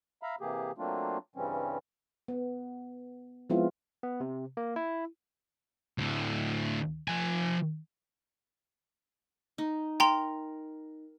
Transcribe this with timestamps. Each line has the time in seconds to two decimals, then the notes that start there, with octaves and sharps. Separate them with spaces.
0.23 E5 F5 A#5 B5
0.41 C3 E3 A#3 G4 G#4
0.78 F#3 A3 A#3 C4 D4 F4
1.36 G2 C#3 E3 G3 C4 C#4
2.28 B3
3.50 F3 G#3 B3 C4 E4 F4
4.03 B3
4.20 C3
4.57 A#3
4.76 E4
5.98 D2 A2
7.08 F3 G#5
9.58 D#4
10.00 A#4 G5 A#5 C6